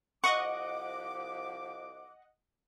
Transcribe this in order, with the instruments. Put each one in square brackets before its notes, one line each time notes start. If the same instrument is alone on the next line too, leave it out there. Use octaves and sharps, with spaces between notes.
[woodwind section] C2 F3 D6 [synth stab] D#5 F#5 [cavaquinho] C#6